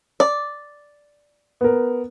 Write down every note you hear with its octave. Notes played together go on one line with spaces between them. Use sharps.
D5
B3 A#4